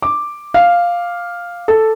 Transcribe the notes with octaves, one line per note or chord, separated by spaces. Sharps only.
D6
F5
A4